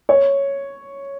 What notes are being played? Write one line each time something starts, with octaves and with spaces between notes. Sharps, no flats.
C#5